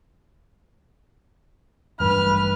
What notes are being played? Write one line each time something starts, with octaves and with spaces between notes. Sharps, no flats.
A1 G2 B4 F6